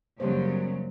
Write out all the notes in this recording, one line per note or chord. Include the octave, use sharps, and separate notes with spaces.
F#2 C#3 F#3 G3 A#3 C5